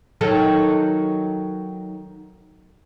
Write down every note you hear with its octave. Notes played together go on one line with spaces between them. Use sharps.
D#3 F#3 A4